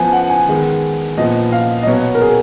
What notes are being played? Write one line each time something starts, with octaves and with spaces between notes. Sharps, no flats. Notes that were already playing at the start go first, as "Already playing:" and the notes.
Already playing: F3 B3 G#5
F#5
G#5
D#3 G#3 B3
A#2 F3 B3 D#5
F5
D#5
B2 F#3 B3 C#5
A#4
G#4